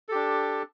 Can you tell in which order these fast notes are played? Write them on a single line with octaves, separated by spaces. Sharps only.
A4 G4 D4